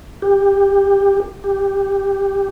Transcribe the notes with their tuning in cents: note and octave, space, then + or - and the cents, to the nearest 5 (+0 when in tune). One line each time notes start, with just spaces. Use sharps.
G4 +15
G4 +5